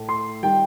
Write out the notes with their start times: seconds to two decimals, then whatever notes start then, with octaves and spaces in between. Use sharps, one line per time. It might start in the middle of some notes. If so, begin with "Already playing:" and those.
Already playing: A2 A3
0.09 C6
0.43 D#3 G3 G5